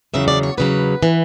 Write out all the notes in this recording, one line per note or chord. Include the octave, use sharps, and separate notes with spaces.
E2 C#3 F#3 E5
D5
C#5
E2 C#3 F#3 B4
E3